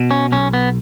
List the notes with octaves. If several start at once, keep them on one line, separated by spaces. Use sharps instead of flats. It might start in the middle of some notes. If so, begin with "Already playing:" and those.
Already playing: B2
C#4
B1 C#4
B3